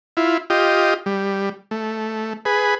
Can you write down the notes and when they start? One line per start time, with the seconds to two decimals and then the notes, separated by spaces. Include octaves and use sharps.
0.17 E4 F4
0.50 F4 G4 D#5
1.06 G3
1.71 A3
2.45 G#4 B4